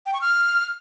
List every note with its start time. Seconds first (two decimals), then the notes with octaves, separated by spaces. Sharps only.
0.06 G5
0.14 C#6
0.21 F6